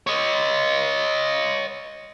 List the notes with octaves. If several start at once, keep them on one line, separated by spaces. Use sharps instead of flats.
C#5 D#5